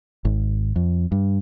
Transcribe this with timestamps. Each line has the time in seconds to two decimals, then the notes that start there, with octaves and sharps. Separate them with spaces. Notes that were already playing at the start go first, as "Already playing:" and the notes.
0.25 G#1
0.76 F2
1.12 G2